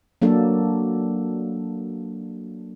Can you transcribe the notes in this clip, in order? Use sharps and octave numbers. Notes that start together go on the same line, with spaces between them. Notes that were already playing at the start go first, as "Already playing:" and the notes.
F#3 A#3 D4 A4